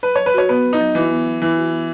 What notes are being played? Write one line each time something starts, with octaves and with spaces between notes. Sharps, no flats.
F#3 B4
F#3 C#5
B4
F#4 C#5
B3 B4
F#3
D#4
F#3
E3 F#4
B3
F#3
E3 F#3
F#4
B3